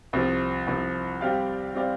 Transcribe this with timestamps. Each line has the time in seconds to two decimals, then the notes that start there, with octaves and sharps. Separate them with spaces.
0.13 C2 C3 F3
0.67 C2 C3 F3
1.21 G3 C4 G4 D5 F5
1.75 G3 C4 G4 D5 F5